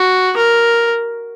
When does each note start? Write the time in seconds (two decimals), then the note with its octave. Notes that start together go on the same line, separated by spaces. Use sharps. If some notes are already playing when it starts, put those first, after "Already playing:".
Already playing: F#4
0.37 A#4